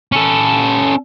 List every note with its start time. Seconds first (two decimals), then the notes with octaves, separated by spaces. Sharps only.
0.12 C#4 A4